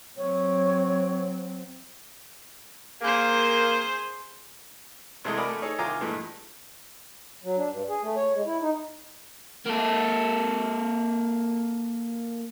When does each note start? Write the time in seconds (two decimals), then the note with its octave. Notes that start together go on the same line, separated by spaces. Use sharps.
0.17 F#3 C4 C#5
3.02 A#3 G#4 C5
5.25 C2 C3 G#3 A3 E4 D#5
5.37 F#4 A#4 D5 G#5 B5
5.49 A3
5.62 D#4 G#4 A4 C#5
5.78 C2 D#3 F4 G#5 A#5 D6
6.01 G2 A#2 E3 G#3 A3
7.44 F#3
7.57 D4
7.70 G2
7.89 G#4
8.03 A3
8.17 C#5
8.34 G#3
8.46 E4
8.62 D#4
9.66 A#3 A4